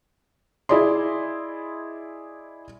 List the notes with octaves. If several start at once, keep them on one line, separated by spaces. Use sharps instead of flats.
E4 G#4 D5 D#5 C6